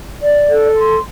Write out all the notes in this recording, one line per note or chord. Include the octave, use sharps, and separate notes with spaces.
D5
A4
C6